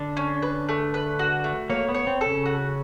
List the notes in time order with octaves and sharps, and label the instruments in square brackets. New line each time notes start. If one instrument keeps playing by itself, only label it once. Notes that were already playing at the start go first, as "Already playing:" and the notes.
Already playing: [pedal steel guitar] D3 D4
[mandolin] C#4
B4
A3
B4
F#4
A3
[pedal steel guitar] A#3 [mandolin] C#5
[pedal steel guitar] B3
[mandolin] C#5
[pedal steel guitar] C4
[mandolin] A4
[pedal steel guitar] C#3 C#4
[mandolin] F#4